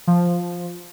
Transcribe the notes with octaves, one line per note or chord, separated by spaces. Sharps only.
F3